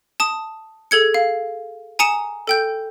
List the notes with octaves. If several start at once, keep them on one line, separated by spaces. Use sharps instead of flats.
A5 D#6
G#4 A4 G#6 C#7
F5
G#5 A#5 D#6 C#7 E7
A4 G5 G6